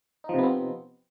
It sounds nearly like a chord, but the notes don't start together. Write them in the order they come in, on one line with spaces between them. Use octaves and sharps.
D#4 F3 C3 B3 C4